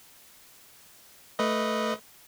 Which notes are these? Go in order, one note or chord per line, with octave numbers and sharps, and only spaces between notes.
A3 B4 D#5